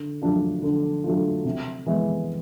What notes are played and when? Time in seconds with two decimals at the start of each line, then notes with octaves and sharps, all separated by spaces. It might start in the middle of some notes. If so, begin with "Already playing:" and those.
Already playing: D3
0.22 F#3 A3 D4 F4
0.62 D3
1.04 F#3 A3 D4 F4
1.45 C3
1.86 E3 G#3 B3